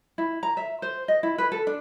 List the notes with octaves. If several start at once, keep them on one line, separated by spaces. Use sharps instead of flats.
E4
A#5
E5
C5
D#5
E4
B4
A4
D4